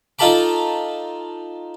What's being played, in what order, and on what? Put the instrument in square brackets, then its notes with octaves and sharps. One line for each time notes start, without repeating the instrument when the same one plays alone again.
[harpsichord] D#4 F4 A4 A5 B5 D6